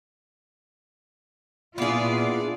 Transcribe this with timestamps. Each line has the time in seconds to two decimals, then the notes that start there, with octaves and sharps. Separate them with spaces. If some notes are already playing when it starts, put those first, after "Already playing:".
1.78 A#2 B3 D4 E4 F4 G#4 D5